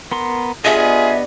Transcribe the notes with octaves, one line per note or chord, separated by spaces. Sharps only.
B3 A#4 C6
B3 D4 F4 G4 G#4 D#5 E5